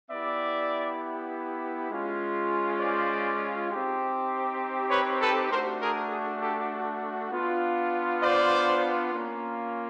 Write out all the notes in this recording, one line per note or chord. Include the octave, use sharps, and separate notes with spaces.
B3 E4 G4 D5 E5
G#3 C#4 F4
C5 D5
C4 D#4 G4
B4 C#5
A4 B4
A3 D4 F#4 A#4 C5
G#4 A#4
G#4
G4 A4
B3 D4 F4
C5 D5
A#3 C#4 F4